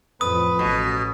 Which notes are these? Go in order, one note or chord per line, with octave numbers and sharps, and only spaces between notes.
F2 A2 F3 B4 D#6
A1 B2